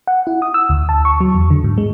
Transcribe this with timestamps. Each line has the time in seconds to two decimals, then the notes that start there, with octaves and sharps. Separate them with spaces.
0.07 F#5
0.27 E4
0.42 D#6
0.54 E6
0.69 D2
0.89 A5
1.05 C#6
1.20 F#3
1.34 E2
1.51 D3
1.64 G#2
1.78 G#3